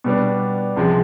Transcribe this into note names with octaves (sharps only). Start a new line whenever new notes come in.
B2 G3 B3 D4
C#2 C3 F3 G#3